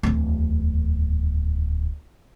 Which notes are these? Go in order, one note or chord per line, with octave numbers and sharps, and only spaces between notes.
D1 E2